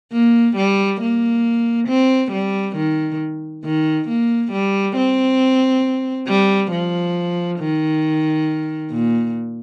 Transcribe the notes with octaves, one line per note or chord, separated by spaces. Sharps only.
A#3
G3
A#3
C4
G3
D#3
D#3
A#3
G3
C4
G3
F3
D#3
A#2